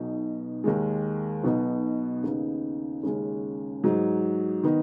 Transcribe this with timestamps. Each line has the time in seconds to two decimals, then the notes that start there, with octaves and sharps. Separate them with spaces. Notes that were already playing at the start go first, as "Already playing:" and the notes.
Already playing: B1 B2 B3 D#4
0.64 D#2 D#3 G#3
1.43 B1 B2 B3 D#4
2.24 D#2 C#3 B3 D#4
3.03 D#2 C#3 G#3 C#4
3.84 G#2 F#3 D#4
4.63 D#3 B3 D#4